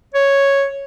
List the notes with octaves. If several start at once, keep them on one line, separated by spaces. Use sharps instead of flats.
C#5